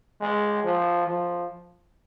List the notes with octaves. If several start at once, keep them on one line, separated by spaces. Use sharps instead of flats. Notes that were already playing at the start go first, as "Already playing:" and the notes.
G#3
F3
F3